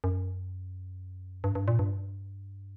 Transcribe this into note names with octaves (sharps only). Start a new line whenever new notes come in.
F#2
G2
G2
A#2
G2